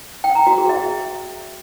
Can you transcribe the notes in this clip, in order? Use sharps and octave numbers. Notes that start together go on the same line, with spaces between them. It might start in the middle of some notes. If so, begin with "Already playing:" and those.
G5
A#5
F#4
G#4
E5